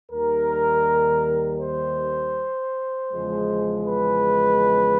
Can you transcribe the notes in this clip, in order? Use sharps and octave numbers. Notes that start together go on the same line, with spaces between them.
D#2 D#3 G3 A#4
C5
E2 C#3 F3 G#3
B4